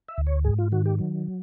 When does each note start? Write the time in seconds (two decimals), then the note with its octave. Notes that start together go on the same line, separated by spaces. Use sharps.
0.08 E5
0.18 D2
0.27 C#5
0.44 G#2 G#4
0.58 F4
0.72 D#3 F#4
0.86 G4
0.99 F#3